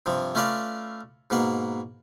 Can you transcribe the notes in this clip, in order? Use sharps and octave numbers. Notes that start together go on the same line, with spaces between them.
G2 C3 F3
A3 C#4 F4 B4 D5 F5
G#2 B2 A#3 B4